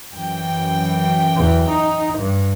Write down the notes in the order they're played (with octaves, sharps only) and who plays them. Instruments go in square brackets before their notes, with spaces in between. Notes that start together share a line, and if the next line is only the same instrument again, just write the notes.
[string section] F#2 E3 G5
[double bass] E2
D#4
G2